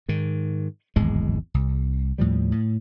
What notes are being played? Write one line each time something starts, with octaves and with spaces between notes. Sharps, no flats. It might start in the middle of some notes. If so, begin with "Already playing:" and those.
G#2 D#3
D1 G#1 E2 G#3
C2
D#2 A2 F3 G3
A2